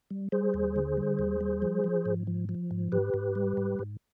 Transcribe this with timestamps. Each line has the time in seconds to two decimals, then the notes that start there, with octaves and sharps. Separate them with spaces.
0.11 G3
0.32 G3 G#4 C5
0.54 D#2
0.76 D3
0.97 G3
1.19 D#2
1.41 G3
1.62 F3
1.84 F3
2.06 G#2
2.27 F3
2.49 F3
2.71 G#2
2.92 G#2 G4 B4
3.14 G#2
3.35 G3
3.57 G#2
3.79 G#2